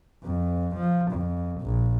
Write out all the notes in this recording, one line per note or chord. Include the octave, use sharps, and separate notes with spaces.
F2
F3
F2
A#1